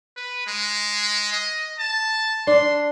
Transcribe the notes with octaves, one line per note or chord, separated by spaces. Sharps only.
B4
G#3
D#5
A5
D4 C6